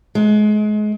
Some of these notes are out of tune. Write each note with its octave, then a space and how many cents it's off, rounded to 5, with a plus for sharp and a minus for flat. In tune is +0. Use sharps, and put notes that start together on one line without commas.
G#3 +30